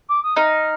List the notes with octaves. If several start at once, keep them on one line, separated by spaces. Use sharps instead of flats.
D6
D#6
D#4 F6